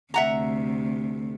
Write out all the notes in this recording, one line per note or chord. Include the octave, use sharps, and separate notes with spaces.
D2 C3 E5 F#5 A#5